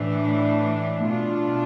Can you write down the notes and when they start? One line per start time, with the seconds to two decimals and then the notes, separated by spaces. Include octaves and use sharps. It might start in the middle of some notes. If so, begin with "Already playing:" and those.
Already playing: A2 E3 A3 D4
1.06 B2 A3 D4 F4